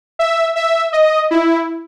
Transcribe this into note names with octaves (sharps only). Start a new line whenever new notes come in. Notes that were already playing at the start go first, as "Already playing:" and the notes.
E5
E5
D#5
E4